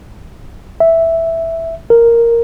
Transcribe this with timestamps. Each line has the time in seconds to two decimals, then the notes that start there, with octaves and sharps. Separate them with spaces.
0.80 E5
1.90 A#4